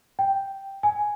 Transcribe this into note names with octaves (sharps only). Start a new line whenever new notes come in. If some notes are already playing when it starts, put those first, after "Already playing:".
G5
G#5